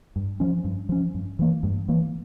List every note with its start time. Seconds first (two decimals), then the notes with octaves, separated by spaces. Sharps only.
0.16 G2
0.40 F3 C#4
0.64 G2
0.89 F3 C#4
1.14 G2
1.39 E3 A#3
1.63 G2
1.88 E3 A#3